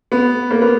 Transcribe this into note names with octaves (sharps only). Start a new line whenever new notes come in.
B3
A#3
B3